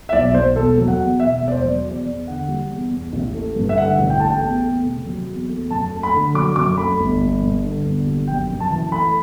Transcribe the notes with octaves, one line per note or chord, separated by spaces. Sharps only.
E5
B1 D5
B1 C5
E1 A4
F#3
F#5
E2
B2 E5
E1
D5
C5
F#3
E2 D5
E2
D3 F#5
G3
E2
E2
A1
A3
G2
E5
D3 F#5
A1
G5
A3 A5
G5
E2
A3
C3
F#3
E2
A3
F#2 A5
A3
B5
D3
F#3 D6
F#2 D6
A3 B5
G1
G3
G2
D3
G1
G3
F#2 G5
F#2
A5
E3
A3 B5